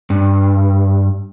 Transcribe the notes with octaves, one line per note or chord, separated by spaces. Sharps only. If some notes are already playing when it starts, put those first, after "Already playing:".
G2